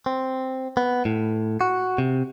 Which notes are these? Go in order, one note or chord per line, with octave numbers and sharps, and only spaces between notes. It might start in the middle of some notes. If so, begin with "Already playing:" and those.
C4
B3
A2
F#4
C3